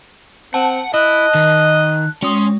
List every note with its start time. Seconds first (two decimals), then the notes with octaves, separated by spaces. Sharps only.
0.54 C4 F#5 A5
0.94 E4 D#5 F#6
1.35 D#3
2.23 G#3 C#4 C6 D#6